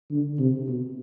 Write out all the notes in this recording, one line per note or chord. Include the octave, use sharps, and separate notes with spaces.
D3
C3
B2